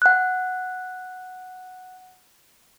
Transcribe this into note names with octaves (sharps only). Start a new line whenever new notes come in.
F#5 F#6